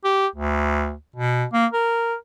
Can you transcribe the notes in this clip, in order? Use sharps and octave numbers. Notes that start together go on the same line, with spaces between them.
G4
D2
B2
A#3
A#4